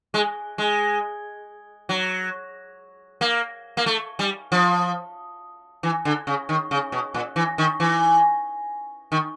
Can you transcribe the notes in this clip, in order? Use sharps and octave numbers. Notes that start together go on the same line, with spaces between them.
G#3
G#3
F#3
A#3
A#3
A3
G3
F3
E3
D3
C#3
D#3
C#3
B2
A#2
E3
D#3
E3
D#3